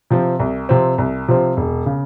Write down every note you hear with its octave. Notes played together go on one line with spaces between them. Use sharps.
C3 F3 C4
C2
C3 F3 C4
C2
C3 F3 C4
E1
C#3